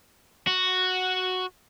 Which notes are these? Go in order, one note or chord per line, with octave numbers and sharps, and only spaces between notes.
F#4